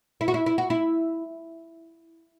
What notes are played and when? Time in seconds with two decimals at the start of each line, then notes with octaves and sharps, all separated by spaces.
0.21 E4
0.28 F#4
0.34 E4
0.46 E4
0.58 F#4
0.70 E4